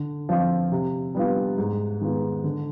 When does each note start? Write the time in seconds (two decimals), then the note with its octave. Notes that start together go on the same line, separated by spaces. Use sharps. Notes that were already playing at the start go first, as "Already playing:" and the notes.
Already playing: D3
0.29 F3 C4 F4
0.72 C3
1.15 G3 B3 D4 F4
1.58 G#2
2.01 D#3 G#3 B3 F4
2.44 D3